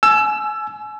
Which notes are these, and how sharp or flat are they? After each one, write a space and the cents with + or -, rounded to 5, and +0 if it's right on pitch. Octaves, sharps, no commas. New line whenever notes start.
G#5 +35 E6 +20